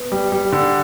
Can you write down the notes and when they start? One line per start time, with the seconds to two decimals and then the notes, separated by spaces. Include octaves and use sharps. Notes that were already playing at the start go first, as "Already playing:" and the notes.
Already playing: B3
0.12 G3
0.32 G3
0.52 D3